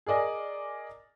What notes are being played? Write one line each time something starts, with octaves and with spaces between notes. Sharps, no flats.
G#4 A#4 D5 D#5 G#5